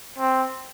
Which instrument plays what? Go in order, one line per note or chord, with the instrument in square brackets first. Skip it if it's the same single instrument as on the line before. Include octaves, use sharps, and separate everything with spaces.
[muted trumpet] C4